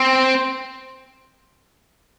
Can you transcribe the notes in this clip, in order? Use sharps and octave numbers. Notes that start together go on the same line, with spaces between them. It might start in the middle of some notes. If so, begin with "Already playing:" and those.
Already playing: C4